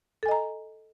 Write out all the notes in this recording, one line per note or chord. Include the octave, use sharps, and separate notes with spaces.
A4 D#5 G#5 A#5